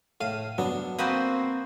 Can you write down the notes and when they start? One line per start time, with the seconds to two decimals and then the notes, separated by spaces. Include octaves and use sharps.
0.21 A2 F5 D#7
0.58 G2 F#3 B3 D4
0.99 A#3 C4 F#4 C5 B5 D#6